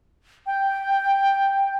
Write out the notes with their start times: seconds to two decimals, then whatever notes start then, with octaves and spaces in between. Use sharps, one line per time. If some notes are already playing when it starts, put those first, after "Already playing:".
0.47 G5